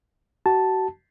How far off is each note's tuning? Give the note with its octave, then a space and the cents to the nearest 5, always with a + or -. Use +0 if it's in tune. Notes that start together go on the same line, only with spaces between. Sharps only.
F#4 +35 A5 +0